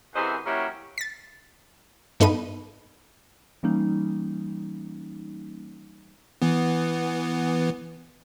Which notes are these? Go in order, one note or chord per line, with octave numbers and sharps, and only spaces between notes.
F#2 C3 E3 G#4 C5 D#5
F#3 A#3 C#4 E4 G4
A6 B6
G2 B3 D#4 A4 B5 D#7
E3 G3 A#3 C#4 D#4
E3 B3